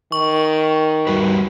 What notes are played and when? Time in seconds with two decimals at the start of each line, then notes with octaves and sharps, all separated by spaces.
0.12 D#3 C#6
1.07 G3 F#4 B4